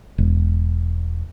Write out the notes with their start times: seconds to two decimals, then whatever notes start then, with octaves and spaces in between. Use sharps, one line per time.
0.18 E1